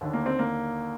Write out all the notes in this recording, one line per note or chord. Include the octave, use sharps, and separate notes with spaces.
D#2 D3
A#3
C4
A#3